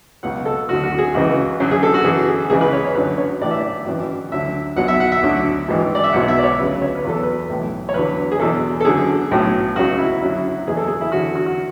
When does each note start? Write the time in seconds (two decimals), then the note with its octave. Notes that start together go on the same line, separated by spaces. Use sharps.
0.23 C#2 B2 F#3 F#5
0.46 A4
0.69 D2 D3 F#3 F#4
0.84 F#4
0.98 G#4
1.14 C#2 C#3 E3 F#4
1.60 F#2 D3 F#3
1.71 G#4
1.83 A4
1.94 F#4
2.04 F#2 E3 G#4
2.28 G#4
2.50 C#2 C#3 E3 G#4
2.61 B4
2.73 C#5
2.84 C#5
2.95 F#2 D3 F#3 B4
3.18 C#5
3.40 A1 A2 E3 D5
3.51 E5
3.60 D5
3.86 G#1 F#2 E3
4.32 D2 D3 F#3 E5
4.76 B1 B2 F#3 F#5
4.88 E5
5.00 F#5
5.12 E5
5.22 D2 D3 F#3
5.68 G#1 G#2 E3
5.95 D5
6.04 E5
6.13 B1 B2 F#3 F#5
6.28 E5
6.39 D5
6.43 C#5
6.58 D2 C#3 F#3 B4
6.82 C#5
6.95 B4
7.05 E2 B2 F#3 A4
7.23 B4
7.49 B1 A2 E3
7.89 C#5
7.94 E2 D3 F#3 B4
8.32 G#4
8.39 E2 B2 F#3 A4
8.81 A4
8.85 F#2 D3 F#3 G#4
9.31 B1 A2 F#3
9.76 C#2 C#3 F#3 F#4
9.98 E4
10.21 F#2 D3 F#3 E4
10.67 E2 B2 F#3 G#4
10.77 A4
10.88 G#4
11.01 E4
11.12 E2 D3 F#3 F#4
11.36 F#4
11.46 F#4